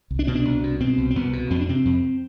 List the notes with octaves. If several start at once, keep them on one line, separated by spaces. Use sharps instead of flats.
C2
D4
B2 C4
D4
C2
B2
B2 C4
C2
C4
C2 B3
B2
F2 C4
D4
C3 C4
F2